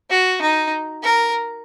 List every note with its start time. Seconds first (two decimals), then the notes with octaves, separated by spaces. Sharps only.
0.10 F#4
0.42 D#4
1.03 A#4